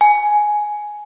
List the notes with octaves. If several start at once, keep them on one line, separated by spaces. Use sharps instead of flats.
G#5